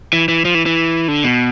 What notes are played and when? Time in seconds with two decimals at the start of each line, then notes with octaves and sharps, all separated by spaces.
0.13 E3
0.28 E3
0.45 F3
0.55 E3
0.66 E3
1.08 D3
1.24 B2